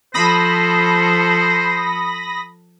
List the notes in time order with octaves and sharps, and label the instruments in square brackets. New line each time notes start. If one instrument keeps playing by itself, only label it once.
[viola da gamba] F3 A4 [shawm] C5 [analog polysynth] B5 D#6 A#6